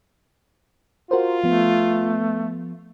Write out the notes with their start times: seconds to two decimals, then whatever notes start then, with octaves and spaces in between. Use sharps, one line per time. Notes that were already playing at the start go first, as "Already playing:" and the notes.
1.11 F4 F#4 A#4 C5
1.44 F3 A3 B3